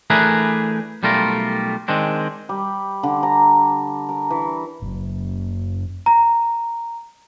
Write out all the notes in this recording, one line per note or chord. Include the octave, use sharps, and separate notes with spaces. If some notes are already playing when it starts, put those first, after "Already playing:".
E3 A3 D4 G#4 A#4 B4
B1 G3 A3 F4 A#4
D#3 G#3 C4 D4
G3
D3
A#5
A#4
E3
F#1 F#2
A#5